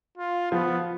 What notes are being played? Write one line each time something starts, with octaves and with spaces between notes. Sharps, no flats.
F4
F3 B3